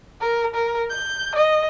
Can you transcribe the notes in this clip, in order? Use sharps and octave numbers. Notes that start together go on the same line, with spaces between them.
A#4
A#4
G6
D#5